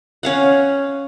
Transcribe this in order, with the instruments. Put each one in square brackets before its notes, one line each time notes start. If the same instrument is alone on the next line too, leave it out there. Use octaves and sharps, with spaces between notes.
[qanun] C#4 F5 F#5